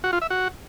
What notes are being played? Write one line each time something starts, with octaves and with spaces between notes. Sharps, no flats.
F#4
F4
E5
F#4